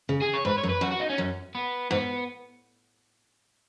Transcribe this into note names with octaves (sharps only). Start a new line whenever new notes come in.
C#3
G#4
C#5
G#2 B4
C#5
F#2
B4
F#2 F#4
F#4
D#4
C#4
F#2
B3
G#2 B3